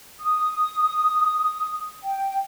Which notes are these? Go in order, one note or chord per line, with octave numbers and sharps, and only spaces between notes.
D#6
G5